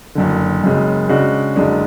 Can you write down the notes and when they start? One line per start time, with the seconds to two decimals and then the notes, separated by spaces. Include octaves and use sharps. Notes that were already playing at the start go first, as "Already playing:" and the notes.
0.15 F#1 F#2 D3
0.62 F#1 F#2 C#3 G#3
1.09 C#3 G#3 D4 F#4
1.56 F#1 F#2 D3 G#3 D4